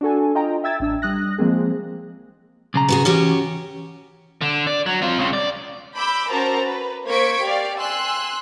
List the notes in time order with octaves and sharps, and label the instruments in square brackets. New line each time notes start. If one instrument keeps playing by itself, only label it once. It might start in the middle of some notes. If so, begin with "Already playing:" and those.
[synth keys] D4 F#4 A4 G#5
F4 D#5 G5 A#5
E5 G5 E6 G#6 A6
A1 D4 E6
G3 D#6 F#6 A#6
F3 G#3 A#3 C4 G#4
[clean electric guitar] B1 C#3 A#5
[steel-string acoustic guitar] B3 F#4 G#4
[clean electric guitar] E3 [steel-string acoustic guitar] C#4 F#4 G4
[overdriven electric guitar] D3
D5
F#3
C4 F4
C#2 C#3
D5
[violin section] B5 D6 E6 G6
C#4 F#4 A#4 C5 A5 A#5
B4
A#3 C5 C#6 G#6 B6 D7
G4 D5 F5
G#5 C6 E6 F#6